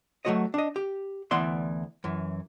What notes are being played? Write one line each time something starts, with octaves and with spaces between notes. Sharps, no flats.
F#3 G#3 A3 F#4 C#5 D#5
D4 D#5
G4
D2 E3 B3 D5 E5 C6
F#2 E3